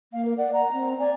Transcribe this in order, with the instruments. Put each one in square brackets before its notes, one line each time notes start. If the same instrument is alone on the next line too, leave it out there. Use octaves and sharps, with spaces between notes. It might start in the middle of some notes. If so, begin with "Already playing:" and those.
[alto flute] A#3 [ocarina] F5
[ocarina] A#4
[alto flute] D5 [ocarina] F#5
[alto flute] F#5 [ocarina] A#5
[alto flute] C4
[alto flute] D5 [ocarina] G#5